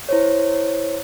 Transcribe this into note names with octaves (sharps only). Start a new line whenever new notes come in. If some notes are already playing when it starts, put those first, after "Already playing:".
E4 C5 C#5